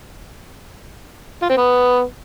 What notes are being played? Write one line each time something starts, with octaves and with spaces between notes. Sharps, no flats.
F4
C4
B3